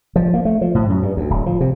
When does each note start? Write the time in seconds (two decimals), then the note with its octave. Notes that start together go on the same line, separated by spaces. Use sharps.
0.16 F3
0.34 A#3
0.45 A3
0.61 F3
0.75 A2
0.90 F#2
1.03 G2
1.17 D2
1.30 D1
1.46 F3
1.61 C3